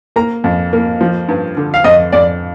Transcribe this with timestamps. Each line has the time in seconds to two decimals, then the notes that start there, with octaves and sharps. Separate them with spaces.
0.16 A#3 A#5
0.44 F2
0.73 A#3
1.01 F3
1.29 G2
1.57 D3
1.74 F5
1.84 F2 D#5
2.12 F2 D5